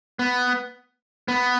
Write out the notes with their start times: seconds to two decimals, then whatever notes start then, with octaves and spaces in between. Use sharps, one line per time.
0.19 B3
1.28 B3